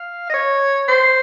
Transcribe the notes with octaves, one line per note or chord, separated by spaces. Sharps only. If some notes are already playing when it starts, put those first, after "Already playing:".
Already playing: F5
D#5
C#5
C5